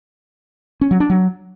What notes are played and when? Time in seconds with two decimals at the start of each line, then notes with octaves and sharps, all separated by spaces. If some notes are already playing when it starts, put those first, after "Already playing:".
0.81 C#4
0.91 F#3
1.00 D4
1.10 F#3